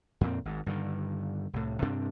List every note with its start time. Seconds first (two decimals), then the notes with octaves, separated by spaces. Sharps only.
0.21 F2 A#2 C4
0.45 G#1 G#2
0.66 G2 D3 D#3
1.53 C2 A2
1.82 G2 C3 C4 D4